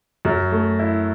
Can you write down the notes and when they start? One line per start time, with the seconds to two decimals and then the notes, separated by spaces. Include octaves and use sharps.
0.25 F#2
0.52 A3
0.79 E4